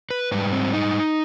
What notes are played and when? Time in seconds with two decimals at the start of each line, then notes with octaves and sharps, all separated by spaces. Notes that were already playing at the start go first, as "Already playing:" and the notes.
0.11 B4
0.32 G#2 G3 B4
0.52 C4
0.73 D#4